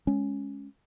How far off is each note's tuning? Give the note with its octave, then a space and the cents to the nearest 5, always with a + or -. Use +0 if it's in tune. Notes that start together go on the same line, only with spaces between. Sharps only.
G#3 +0 C#4 +0